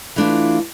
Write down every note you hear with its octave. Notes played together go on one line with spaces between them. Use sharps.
E3 A3 D4 F4